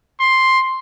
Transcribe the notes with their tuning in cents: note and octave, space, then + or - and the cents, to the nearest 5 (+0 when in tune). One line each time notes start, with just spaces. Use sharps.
C6 +5